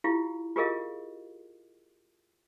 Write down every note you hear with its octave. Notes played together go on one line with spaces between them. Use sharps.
E4 F4 G4 F5
F4 G4 G#4 A#4 D#5 F5